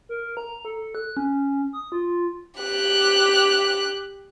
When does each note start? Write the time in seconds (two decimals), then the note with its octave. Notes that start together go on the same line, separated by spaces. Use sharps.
0.09 A#4
0.37 A#5
0.65 A4
0.95 F#6
1.17 C#4
1.73 D#6
1.92 F4
2.60 G4 F#6